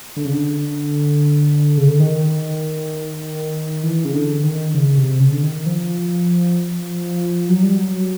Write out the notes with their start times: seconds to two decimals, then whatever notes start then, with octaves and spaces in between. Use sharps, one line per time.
0.16 D3
0.25 C#3
0.32 D3
1.77 C#3
1.88 D3
2.00 D#3
3.83 E3
4.05 C#3
4.13 D3
4.44 D#3
4.74 C#3
4.97 C3
5.20 C#3
5.32 D3
5.43 D#3
5.66 F3
7.49 F#3
7.62 G3
7.76 F#3